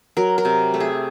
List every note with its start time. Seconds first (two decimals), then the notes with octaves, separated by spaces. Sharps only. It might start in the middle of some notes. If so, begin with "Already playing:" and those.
0.17 F#3 A#4
0.38 A#4
0.45 C3
0.74 A3
0.80 G#4